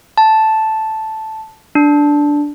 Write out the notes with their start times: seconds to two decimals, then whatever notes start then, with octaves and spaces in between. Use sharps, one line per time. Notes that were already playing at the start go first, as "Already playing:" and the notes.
0.17 A5
1.75 D4